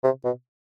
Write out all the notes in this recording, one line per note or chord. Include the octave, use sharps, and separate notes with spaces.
C3
B2